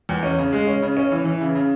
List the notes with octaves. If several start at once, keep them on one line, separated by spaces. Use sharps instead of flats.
E2
C#4
C#3
G#3
C#4
C#3
C#4
E3
E3
C#3
C#3